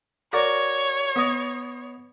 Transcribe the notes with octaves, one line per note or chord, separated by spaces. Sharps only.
F#4 A#4 C#5 D5
B3 D#5